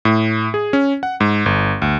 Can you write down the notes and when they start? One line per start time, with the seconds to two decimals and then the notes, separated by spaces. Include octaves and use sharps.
0.05 A2
0.54 G#4
0.73 C#4
1.03 F#5
1.20 G#2
1.46 G1
1.82 D2